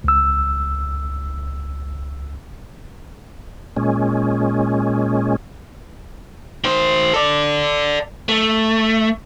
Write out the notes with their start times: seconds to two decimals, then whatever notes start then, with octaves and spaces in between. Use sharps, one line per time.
0.04 C#2 E6
3.77 A#2 G#3 C#4
6.64 D#3 C5
7.13 A4 D5
8.29 A3